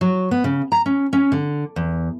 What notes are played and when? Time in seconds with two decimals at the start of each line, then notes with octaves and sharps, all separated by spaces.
0.01 F#3
0.31 B3
0.44 C#3
0.72 A#5
0.86 C#4
1.13 C#4
1.32 D3
1.76 E2